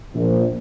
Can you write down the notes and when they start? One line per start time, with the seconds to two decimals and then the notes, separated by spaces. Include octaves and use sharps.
0.15 A#1